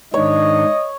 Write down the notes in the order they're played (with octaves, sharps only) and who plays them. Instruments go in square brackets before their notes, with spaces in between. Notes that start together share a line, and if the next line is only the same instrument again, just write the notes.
[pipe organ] G#2 D#3 D4 [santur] C#5 [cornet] D#5